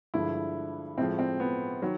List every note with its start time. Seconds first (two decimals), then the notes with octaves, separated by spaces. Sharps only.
0.14 G2 D3 F3 G#3 E4
0.98 A2 F3 G#3 C4
1.19 C4
1.40 B3
1.82 D#3 F#3